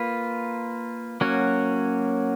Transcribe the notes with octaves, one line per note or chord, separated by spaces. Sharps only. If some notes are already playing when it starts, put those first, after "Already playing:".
Already playing: A#3 F4 B4
F#3 A#3 C#4 F#4 C#5